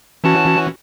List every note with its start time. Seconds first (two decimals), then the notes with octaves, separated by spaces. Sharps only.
0.24 E3 C#4 F#4 A5